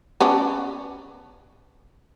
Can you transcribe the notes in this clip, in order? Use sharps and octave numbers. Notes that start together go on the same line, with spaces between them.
B3 C#4 D4